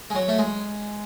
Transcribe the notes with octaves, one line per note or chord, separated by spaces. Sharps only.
G#3
F#3
A3
G#3